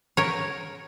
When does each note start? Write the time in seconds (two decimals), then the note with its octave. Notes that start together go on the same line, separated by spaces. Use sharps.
0.17 A#4 C#5